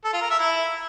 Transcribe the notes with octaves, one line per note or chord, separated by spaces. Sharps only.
A4
F4
A#4
E5
E4